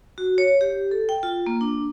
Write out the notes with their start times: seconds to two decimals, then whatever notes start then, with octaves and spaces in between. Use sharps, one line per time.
0.18 F#4
0.38 C#5
0.61 G4
0.91 A4
1.09 G5
1.23 F4
1.47 A#3
1.61 D4